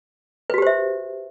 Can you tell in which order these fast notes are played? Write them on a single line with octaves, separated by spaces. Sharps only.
B4 F#4 G4 C5 E5